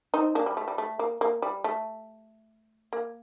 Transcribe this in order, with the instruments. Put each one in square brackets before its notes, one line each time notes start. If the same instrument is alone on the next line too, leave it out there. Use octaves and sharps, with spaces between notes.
[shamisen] C4 D#4
A#3 D4
G3
A3
G3
A3
A#3
A#3
G3
A3
A#3